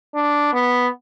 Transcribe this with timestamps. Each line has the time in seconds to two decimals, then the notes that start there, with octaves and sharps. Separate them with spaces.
0.14 D4
0.53 B3